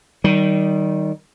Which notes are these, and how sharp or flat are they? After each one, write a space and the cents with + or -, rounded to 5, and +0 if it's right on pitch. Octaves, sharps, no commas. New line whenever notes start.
D#3 +0 G3 -30